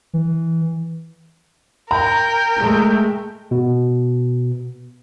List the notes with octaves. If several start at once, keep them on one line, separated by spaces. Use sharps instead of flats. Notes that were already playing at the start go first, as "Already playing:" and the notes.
E3
A#4 G5 A#5
G#3 A3
B2